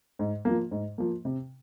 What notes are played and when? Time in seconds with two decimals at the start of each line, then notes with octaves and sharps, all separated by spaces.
0.19 G#2
0.45 F3 A#3
0.71 G#2
0.98 F3 A#3
1.25 C3